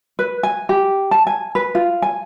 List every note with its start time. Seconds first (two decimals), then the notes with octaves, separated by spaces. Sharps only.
0.19 B4
0.43 G#5
0.69 G4
1.11 A5
1.27 G#5
1.55 B4
1.75 F4
2.02 G#5